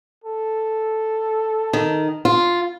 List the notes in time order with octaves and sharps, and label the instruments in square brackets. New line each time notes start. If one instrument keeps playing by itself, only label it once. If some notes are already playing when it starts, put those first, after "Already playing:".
[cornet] A4
[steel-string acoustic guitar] D#3
F4